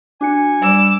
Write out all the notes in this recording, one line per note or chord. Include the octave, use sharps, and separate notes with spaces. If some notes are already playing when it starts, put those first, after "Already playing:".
D4 F#4 G#5 C#7
G3 D6 E6